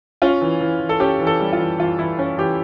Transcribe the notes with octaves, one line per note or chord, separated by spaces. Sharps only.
C#4 F4
E3
E3
E3
A4
C#4 G4
E3
A4
G3
F4
E3
E3 F4
E3 E4
C#4
E3 G4